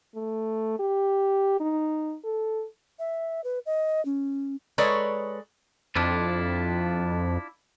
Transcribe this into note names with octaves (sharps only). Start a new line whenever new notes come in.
A3
G4
D#4
A4
E5
B4
D#5
C#4
G#3 A4 B4 C#5 D5 A#5
F2 D4 E4 F4